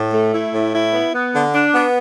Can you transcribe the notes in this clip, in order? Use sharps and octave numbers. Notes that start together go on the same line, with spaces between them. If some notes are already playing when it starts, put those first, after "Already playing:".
Already playing: A2
A3
E4
A2
E4
B3
B3
D3
D4
B3